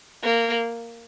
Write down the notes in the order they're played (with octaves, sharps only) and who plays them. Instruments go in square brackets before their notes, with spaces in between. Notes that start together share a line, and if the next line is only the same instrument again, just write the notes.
[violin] A#3